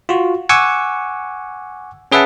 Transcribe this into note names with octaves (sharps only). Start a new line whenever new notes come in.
F4 F#4
F#5 G#5 C#6 D6 E6
C#4 G#4 B4 E5 F#5 A5